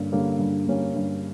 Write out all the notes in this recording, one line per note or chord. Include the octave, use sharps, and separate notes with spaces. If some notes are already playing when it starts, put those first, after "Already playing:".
Already playing: G2 D3 G3 A#3 C#4
D3 G3 A#3 C#4
G2
D3 G3 A#3 C#4
G2